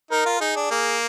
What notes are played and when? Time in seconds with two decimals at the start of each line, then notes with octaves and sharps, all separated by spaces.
0.11 D#4 A#4
0.26 F4
0.40 D#4 G#4
0.56 D4
0.71 A#3 G#4